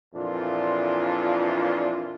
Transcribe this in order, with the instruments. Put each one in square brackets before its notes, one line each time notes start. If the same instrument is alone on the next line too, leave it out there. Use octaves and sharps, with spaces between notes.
[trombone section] F2 A#2 E3 D4 F4